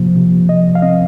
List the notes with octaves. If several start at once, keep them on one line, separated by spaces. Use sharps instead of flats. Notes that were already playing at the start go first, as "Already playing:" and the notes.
Already playing: C3 F3 A#3
C3
F3 D#5
F5
C4 D#5